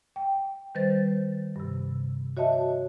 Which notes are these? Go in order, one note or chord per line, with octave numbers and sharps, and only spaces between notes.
G5
D#3 G3 B4 C5 A6
G2 C3
F#4 C#5 D#5 E5 A5